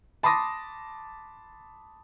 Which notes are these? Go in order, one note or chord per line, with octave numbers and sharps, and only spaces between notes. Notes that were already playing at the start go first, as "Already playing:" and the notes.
A5 B5 C6 D6 D#6 A#6